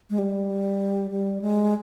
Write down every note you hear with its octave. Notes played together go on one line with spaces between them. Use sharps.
G#3
G3
G3
G#3